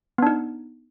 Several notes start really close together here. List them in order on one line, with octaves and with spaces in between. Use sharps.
B3 D4 D#4